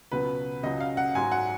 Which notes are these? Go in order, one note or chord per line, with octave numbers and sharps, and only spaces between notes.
C#2 B2 F#3 B4
C#2 C#3 F#3 D#5
F5
F#5
G#2 F#3 G#5
F#5